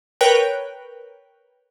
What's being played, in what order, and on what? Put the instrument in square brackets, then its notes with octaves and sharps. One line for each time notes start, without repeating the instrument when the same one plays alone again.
[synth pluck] A#4 B4 C#5 G5 F#6